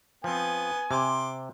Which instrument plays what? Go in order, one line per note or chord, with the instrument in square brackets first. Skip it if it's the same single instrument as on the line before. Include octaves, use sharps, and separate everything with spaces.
[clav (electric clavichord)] F3 C4 [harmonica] B3 [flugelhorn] G#5
[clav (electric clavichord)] C3 [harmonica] C6 D6